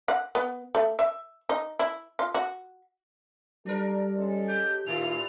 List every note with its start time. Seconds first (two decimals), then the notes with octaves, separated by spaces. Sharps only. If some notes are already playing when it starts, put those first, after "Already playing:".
0.08 F#5
0.35 B3
0.75 A3
0.99 E5
1.49 D#4
1.79 E4
2.19 F4
2.34 F#4
3.66 G3 D4 A4 A#4
4.16 G#3 C#4 A4
4.48 G4 G6
4.86 A2 D#3 A#3 E4 F4 G4 F7